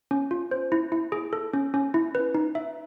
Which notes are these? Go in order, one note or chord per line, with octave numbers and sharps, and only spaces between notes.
C#4
F4
C5
E4
E4
G#4
A4
C#4
C#4
E4
B4
D#4
E5